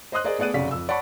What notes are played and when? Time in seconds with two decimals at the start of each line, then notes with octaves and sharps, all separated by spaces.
0.12 C5 D#5 C6 D#6 F#6
0.24 G#4 A#4 C5 D5 D#5
0.38 A3 B3 G#4 D5 F#6 D#7
0.54 F1 F#2 C#3 F#4 D5 B6
0.71 F2 E6
0.88 C#5 D5 F#5 A5 B5 C#6